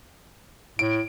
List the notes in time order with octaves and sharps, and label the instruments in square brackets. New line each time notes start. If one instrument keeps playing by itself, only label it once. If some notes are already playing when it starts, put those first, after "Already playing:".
[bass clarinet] A2 [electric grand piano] D7